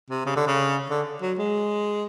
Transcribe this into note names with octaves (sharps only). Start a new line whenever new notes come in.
C3
C#3
D3
C#3
D3
F#3
G#3